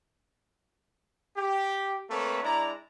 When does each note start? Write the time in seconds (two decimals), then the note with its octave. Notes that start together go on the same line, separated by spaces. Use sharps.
1.37 G4
2.10 A3 A#3 C4 A4 B4 C#5
2.43 G#3 D4 E4 D5 A#5